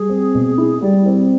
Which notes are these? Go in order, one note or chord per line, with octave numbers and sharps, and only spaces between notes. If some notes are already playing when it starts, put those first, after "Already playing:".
Already playing: G3 G#4
C4
B2
E4 G#4
G3 D5
C4